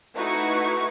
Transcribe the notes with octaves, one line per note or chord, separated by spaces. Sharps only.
A3 D#4 E4 F#4 B4 C#6